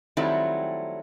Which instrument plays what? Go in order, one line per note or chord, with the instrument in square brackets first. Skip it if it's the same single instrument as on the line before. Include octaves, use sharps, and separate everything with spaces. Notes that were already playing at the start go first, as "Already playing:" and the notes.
[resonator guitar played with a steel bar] D#3 F#3 G3 A3 C4 E4